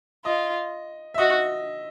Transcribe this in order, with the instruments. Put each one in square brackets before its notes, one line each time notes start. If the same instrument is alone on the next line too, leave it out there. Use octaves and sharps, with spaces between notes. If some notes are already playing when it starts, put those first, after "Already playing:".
[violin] F4 [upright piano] D#5
[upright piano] E5
[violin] F#4 [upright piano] D#5